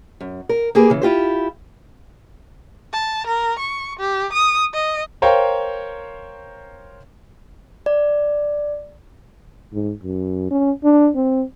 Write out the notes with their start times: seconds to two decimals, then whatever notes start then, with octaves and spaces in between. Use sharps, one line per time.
0.21 F#2
0.49 A#4
0.75 A#3 G4 G#4 A#4 B4
0.90 C#3 E3
1.02 E4 F4 G4 C5
2.93 A5
3.27 A#4
3.59 C#6
3.99 G4
4.32 D#6
4.73 D#5
5.22 A#4 C5 C#5 F5 G5 A#5
7.86 D5
9.73 G#2
10.03 F#2
10.51 C#4
10.84 D4
11.16 C4